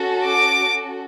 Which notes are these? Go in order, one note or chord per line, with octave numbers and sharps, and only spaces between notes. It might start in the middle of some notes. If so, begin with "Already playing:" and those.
Already playing: C#4 F#4 A4
D6